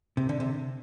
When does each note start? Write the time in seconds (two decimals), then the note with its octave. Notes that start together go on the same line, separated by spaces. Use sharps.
0.17 C3
0.29 D3
0.40 C3